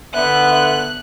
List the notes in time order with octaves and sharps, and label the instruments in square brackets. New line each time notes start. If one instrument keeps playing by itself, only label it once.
[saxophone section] D3 B3 [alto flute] E5 [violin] F#6